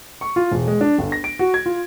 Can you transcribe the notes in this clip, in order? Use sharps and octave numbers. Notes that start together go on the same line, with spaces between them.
C#6
F4
E1
G#3
D4
G1
A#6
D7
F#4
G#6
F4